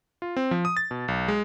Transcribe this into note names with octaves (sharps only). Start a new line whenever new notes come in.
F4
C4
F3
D#6
A6
B2
B1
G#3